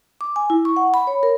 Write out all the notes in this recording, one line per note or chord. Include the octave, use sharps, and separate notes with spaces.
D6
G#5
E4
C#6
F#5
B5
C#5
A#4